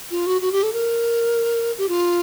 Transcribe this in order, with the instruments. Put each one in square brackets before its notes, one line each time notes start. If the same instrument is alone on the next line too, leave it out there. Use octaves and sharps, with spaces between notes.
[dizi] F4
F#4
F#4
G4
A4
A#4
G4
F4